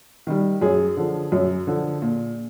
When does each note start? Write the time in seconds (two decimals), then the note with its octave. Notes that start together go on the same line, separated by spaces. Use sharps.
0.27 D#3 G3
0.61 F#2 G#4
0.97 D3 F3
1.32 F#2
1.67 D3 F3
2.02 A#2